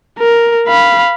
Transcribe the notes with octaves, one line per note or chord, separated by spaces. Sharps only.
A#4
F5 B5